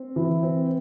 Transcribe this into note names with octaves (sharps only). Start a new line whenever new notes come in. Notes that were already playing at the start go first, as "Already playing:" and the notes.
Already playing: C4
E3
C4